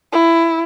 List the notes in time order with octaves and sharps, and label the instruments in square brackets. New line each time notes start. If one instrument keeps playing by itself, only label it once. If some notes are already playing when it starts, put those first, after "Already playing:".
[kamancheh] E4